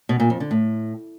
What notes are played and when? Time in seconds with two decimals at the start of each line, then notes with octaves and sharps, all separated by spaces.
0.09 B2
0.20 A#2
0.30 F2
0.40 D3
0.51 A2